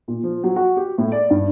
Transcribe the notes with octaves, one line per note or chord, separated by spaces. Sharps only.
A#2
F3
F#3
F#4
G4
A2
D5
G2